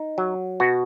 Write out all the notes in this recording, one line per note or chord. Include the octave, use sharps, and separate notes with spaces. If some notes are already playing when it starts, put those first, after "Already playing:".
Already playing: D#4
F#3
B2 F#4